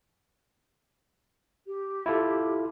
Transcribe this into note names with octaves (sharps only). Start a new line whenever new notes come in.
G4
E4 F4 A4